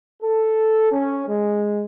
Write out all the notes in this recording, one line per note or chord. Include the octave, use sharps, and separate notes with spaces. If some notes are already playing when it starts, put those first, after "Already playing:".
A4
C#4
G#3